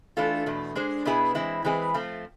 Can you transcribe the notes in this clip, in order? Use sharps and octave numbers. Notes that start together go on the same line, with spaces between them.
E3 A3 D4 F4 A4
E2 B2 A3
G#3 D4 G#4 C5
B2 B3 E4 G#4 B4
E3 G#3 C4 E4
E3 G#3 C4 G#4 B4
F3 A3 C4